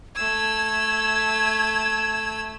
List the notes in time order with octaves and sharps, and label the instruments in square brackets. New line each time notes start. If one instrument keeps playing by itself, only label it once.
[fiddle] A3 E6 [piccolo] G#6